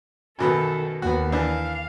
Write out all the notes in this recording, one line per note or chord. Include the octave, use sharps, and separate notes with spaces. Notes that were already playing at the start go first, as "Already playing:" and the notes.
F#2 B2 D#3 B3 A4
D#2 B3 F#4
E3 D4 F5